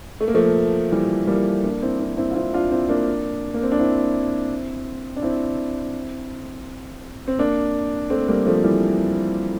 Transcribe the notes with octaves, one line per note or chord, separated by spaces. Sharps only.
A3
A#3
F3 A3
E3 G3
G3 A#3
A#3 D4
C4 E4
C4 E4
C4 E4
F4
C4 E4
D4 F4
C4 E4
A#3 D4
A#3
C4
D4
C4 E4
D4
C4 E4
C4
A#3 D4
A3 C4
G3 A#3
F3 A3
E3 G3